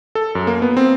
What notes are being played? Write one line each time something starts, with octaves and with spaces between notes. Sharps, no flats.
A4
F#2
A#3
B3
C4